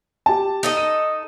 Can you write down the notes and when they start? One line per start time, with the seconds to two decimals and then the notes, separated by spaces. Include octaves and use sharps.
0.26 G4 A5
0.63 D#4 A4 D#5
0.77 D#7